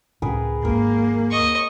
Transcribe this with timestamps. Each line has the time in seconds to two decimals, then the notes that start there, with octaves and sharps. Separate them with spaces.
0.22 C#2 A2 C#4 G#4 A#4 B4
0.65 D#2 G#2 A#3 A#4
1.31 D#5 C#6